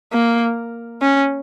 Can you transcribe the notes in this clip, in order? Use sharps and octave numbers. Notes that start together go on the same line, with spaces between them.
A#3
C#4